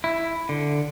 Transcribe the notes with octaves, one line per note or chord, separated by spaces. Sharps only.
E4
D3